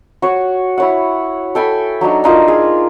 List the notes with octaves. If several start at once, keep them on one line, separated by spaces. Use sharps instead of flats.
F#4 C#5
E4 C#5 F#5
A4 G5 G#5 B5
F#3 D4 D#4 F#4
D4 D#4 F4 A#4
G#4